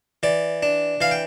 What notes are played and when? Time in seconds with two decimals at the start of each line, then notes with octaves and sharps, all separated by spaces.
0.23 E3 D5
0.63 D4
1.01 E3 F5
1.11 G5